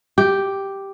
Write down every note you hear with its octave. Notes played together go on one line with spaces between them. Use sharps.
G4